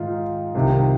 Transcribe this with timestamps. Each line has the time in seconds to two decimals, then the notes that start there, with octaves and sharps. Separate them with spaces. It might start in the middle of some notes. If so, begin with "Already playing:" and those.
Already playing: G#2 D#3 D#4 F4
0.55 C2 C3 D#3